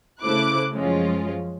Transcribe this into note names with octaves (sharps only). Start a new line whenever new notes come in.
C#3 A3 E4 C5 D6 F#6
F#2 F3 G#3 C#4 F4